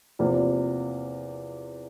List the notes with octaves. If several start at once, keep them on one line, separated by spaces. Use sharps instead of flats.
E2 C3 F3 A#3